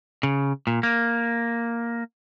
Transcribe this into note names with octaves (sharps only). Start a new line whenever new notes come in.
C#3
A#2
A#3